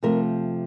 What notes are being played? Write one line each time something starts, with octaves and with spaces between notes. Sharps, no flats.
C3 F3 A3 A#4